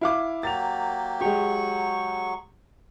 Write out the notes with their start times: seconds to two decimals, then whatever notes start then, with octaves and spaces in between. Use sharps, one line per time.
0.01 E4 F5 D6
0.43 F#3 A#3 G4 A6 F7
1.21 F#3 G#3 G4 C#6